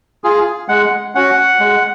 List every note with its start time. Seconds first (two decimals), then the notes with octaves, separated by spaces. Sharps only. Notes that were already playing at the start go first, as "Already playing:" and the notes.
0.24 F4 G#4
0.69 G#3 F#5
1.15 C#4 F#4 F#5
1.60 G#3